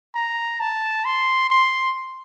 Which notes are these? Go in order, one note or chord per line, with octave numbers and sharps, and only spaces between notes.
A#5
A5
C6
C6